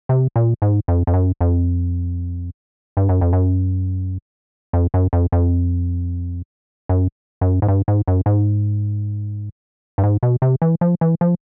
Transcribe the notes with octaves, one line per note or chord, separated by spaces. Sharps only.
C3
A#2
G#2
F2
F2
F#2
F2
G2
F#2
F2
F#2
F2
F#2
F2
F2
F#2
F#2
G#2
G2
G#2
F#2
G#2
G2
G#2
B2
C3
E3
F3
E3
F3